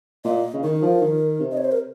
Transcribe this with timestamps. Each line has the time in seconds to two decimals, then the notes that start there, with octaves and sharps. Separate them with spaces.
0.25 A#2 D#5
0.53 C#3
0.63 D#3 A#4
0.82 F3
1.01 D#3
1.40 C3
1.51 D#5
1.57 C#5
1.65 C5
1.72 A#4